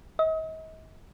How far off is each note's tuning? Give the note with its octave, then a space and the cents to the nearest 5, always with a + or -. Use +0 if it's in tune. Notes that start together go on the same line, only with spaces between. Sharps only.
D#5 +40